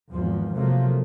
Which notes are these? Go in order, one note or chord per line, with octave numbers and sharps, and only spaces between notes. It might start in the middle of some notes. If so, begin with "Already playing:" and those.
G#1 E2 F3
C3 F3 F#3 A3 A#3